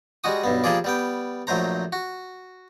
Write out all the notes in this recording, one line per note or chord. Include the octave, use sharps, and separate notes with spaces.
G3 G#3 F#4 D#6
B1 G2 B3
F3 G3 A#3 F4 G#4 D5
G3 B3 G5
A#1 F#3 A3 C5 A#5
F#4